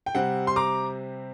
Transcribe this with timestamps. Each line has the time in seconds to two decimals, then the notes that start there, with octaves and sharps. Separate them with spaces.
0.06 G5
0.15 C3 G3 C4 F#5
0.47 C6
0.56 A#5 D6